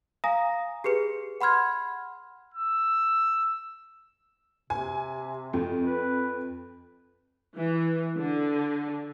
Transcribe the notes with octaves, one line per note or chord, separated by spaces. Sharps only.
F5 G#5 A#5 D#6 A#6
G4 G#4 B4 C#7
F#5 B5 C6 F6 G#6
E6
C3 G#5
F2
B4
E3
D3